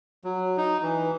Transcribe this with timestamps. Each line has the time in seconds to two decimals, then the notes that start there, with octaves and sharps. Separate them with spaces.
0.24 F#3
0.57 D#4
0.82 E3